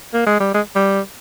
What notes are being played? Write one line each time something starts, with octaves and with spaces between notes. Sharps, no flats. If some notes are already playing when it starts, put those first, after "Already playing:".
A#3
G#3
G3
G#3
G3